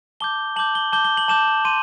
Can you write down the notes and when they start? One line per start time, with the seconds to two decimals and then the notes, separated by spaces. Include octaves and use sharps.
0.20 A5 D6 G6 G7
0.56 A5 D6 G6 F#7
0.75 G7
0.93 A5 D6 G6 G7
1.05 G7
1.17 F#7
1.28 A5 D6 G6 E7
1.65 C6 D#7